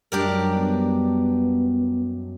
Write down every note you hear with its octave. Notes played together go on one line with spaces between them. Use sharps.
F#2 G3 G#3 D4 G4 A#4
B3